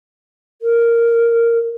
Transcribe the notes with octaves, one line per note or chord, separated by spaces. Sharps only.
A#4